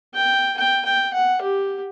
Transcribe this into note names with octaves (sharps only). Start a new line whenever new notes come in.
G5
G5
G5
F#5
G4